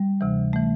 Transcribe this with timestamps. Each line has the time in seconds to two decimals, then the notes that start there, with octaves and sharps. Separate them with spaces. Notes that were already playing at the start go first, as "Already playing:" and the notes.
Already playing: G3
0.21 D2 C3 E3
0.53 E3 A3